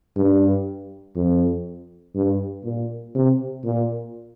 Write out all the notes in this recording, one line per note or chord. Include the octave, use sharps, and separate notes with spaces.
G2
F2
G2
A#2
C3
A#2